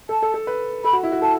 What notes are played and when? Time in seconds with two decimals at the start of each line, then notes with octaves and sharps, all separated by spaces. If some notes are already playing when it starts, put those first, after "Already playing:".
0.09 A4 A5
0.23 A4
0.34 A4
0.47 B4
0.84 A4 B5
0.93 F#4
1.03 E4
1.12 F#4
1.22 A4 A5